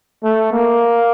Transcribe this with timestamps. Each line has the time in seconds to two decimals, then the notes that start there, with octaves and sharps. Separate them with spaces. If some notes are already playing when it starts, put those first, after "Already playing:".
0.24 A3
0.52 A#3